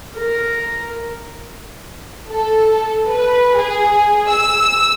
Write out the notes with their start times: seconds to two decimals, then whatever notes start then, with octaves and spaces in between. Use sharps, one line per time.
0.16 A#4
2.29 A4
3.07 B4
3.54 G#4
4.29 E6